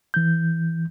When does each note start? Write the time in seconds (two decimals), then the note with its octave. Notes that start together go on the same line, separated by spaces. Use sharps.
0.14 E3 G6